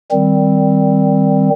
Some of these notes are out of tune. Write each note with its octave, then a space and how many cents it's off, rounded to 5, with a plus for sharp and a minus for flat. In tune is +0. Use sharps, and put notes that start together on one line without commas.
D#3 +0 G3 +0 C4 +0